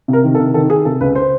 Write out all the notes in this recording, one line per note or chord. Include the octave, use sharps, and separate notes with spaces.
C3
A#4
D#3
A4
C3
D#3 A4
D#3 G#4
C3 A4
C#2 B4
C5